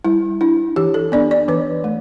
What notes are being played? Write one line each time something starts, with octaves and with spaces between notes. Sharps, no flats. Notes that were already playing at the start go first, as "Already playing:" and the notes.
G3 E4
D4 E4
E3 G4
A4
B3 D4 D5
D5
E3 B4
A3